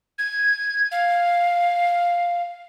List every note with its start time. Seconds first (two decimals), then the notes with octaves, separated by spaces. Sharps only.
0.19 G#6
0.91 F5